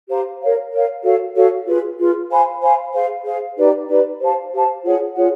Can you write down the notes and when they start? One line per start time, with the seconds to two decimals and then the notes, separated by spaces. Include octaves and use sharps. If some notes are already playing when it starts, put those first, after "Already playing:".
0.09 G4 C5 F5 A#5
0.41 A#4 C#5 F5
0.72 A#4 C#5 F5
1.04 F#4 A4 C#5 F5
1.36 F#4 A4 C#5 F5
1.67 F4 G#4 B4
1.99 F4 G#4 B4
2.31 C5 F5 G#5 B5
2.62 C5 F5 G#5 B5
2.94 G#4 C5 F5
3.25 G#4 C5 F5
3.57 D#4 G4 B4 D5
3.88 D#4 G4 B4 D5
4.20 G4 C5 F5 A5
4.52 G4 C5 F5 A5
4.83 F4 G#4 C#5 F#5
5.15 F4 G#4 C#5 F#5